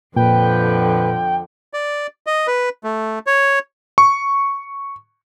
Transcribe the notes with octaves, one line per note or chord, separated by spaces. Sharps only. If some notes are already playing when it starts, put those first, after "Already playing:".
F2 A#2 D3 F3 B4 G5
D5
D#5
B4
A3
C#5
C#6